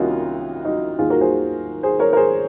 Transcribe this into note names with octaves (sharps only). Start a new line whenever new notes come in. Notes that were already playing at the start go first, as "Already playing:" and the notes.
Already playing: C2 C3 D#3 A#3 C#4 D#4 F4 F#4
D#4 F#4
D#2 D#3 A#3 F4 G#4
F#4 A#4
G#4 C5
G#4 C5
A#4 C#5
A#4
G#4 C5